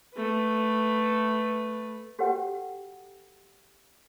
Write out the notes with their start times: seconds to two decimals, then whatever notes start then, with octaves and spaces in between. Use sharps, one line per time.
0.15 A3 B4
2.19 F#4 G4 A4 B4 F#5 G5